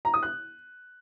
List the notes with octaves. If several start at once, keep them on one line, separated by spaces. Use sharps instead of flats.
A#5
D#6
F#6